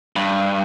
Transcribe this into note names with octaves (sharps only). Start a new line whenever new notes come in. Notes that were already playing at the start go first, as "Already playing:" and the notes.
G2